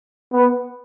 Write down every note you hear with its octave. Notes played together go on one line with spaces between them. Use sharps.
B3